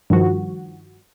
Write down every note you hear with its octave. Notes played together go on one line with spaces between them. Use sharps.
G2 D#3 F3 F#4